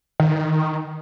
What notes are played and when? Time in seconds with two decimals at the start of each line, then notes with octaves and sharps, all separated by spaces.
0.20 D#3